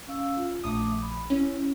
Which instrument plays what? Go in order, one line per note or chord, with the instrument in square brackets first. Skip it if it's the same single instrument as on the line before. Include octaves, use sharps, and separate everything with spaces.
[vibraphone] C#4 F5 E6
F4
[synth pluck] A#1 D#6 [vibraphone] A3 E5 D6
[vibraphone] B5
[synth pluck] C#4 [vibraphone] E4